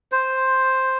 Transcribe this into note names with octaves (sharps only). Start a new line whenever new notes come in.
C5